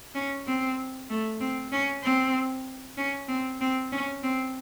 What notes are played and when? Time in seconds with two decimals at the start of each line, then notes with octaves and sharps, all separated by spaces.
0.15 C#4
0.47 C4
1.10 A3
1.40 C4
1.72 C#4
2.03 C4
2.97 C#4
3.28 C4
3.61 C4
3.92 C#4
4.23 C4